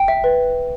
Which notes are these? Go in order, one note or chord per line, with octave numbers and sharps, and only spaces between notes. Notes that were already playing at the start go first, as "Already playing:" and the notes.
Already playing: G5
E5
B4